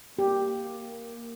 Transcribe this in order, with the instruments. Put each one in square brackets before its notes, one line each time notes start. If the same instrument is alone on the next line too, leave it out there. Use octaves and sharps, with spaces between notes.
[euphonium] A#3 [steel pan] G4